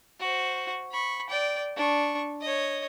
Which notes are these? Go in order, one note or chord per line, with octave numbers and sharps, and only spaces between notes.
F#4 C5
B5 C#6
D5 G5
D4 C#6
C#5 D#5